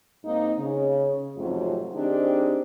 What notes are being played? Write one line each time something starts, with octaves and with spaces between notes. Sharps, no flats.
G#2 A#3 C4 D#4
C#3
F2 G#2 C3 F#3 A3 F4
D#3 C4 D4 D#4 G4 G#4